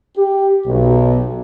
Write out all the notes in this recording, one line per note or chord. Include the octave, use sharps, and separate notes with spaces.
G4
B1